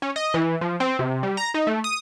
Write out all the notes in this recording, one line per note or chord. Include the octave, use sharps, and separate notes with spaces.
C#4
D#5
E3
F3
C4
C3
G3
A#5
D#4
A3
D#6